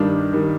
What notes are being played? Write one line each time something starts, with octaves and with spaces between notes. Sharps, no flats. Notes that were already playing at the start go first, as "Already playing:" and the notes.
Already playing: G2 D#3 G3 D4
D#3 G3